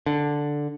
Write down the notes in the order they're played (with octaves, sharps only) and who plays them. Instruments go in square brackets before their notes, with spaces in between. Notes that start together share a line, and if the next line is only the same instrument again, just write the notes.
[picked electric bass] D3